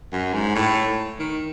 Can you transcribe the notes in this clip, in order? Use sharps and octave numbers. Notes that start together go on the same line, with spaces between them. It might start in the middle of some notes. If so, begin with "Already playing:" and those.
F#2
G#2
A2
D#3